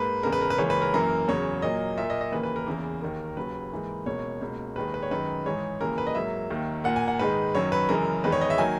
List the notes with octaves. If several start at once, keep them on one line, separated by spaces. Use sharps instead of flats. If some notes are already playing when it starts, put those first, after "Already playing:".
Already playing: G#2 A#3 B4
E2 C#3 G#3 A#4
B4
A#4
B4
C#2 C#3 E3 A#3 C#5
B4
A#4
F#2 E3 A#3 A#4
E2 C#3 F#3 C#5
A#2 F#3 A#3 D#5
A#2 E5
A#3
D#5
D#5
D#2 C#3 E3 A#3 B4
B4
A#4
E2 C#3 E3 A#3
D#2 D#3 A#3
D#2 C#3 F#3 B4
G#2 E3 A#3
C#2 B2 A#3 C#5
C#2 B2 A#3
D#2 D#3 G#3 B4
B4
C#5
F#2 D#3 G#3 B4
G#2 E3 G#3 C#5
D#2 C#3 E3 A#3 A#4
B4
D#5
G#2 F#3 A#3 E5
D#2 D#3 A#3
A#2 A#3 F#5
G#5
F#5
G#2 D#3 G#3 B4
F#2 D#3 F#3 C#5
B4
F#2 C#3 E3 G#3 A#4
E2 D#3 G#3 B4
C#5
D#5
E5
D#3 F#3 A#3 G#5